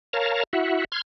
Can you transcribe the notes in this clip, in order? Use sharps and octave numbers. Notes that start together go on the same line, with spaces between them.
A#4 C#5 F5 A5 A#5
E4 F#4 E5 F#5
C6 F6 G#6